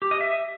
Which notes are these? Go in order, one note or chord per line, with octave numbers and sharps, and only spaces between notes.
G4
D#5
E5